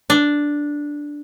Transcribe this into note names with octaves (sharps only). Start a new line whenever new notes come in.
D4